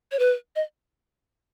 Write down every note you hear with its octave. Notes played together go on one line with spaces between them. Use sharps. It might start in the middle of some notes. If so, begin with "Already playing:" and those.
C#5
B4
D#5